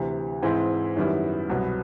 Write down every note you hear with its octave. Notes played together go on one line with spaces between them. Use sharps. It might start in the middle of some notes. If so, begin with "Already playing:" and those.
Already playing: D2 C3 E3
G#2 E3 G#3 C4 E4
F#2 D#3 G3 B3 E4
C2 B2 F#3 B3